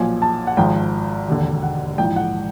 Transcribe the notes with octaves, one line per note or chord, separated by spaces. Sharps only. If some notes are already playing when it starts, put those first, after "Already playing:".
Already playing: B1 A#2 F3 G#5
A5
F#5
G#1 G#2 F3 G5
E1 D#2 D3
F#5
A#1 G#2 E3 G5
F#5